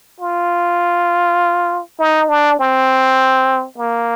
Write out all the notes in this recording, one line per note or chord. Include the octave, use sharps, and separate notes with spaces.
F4
D#4
D4
C4
A#3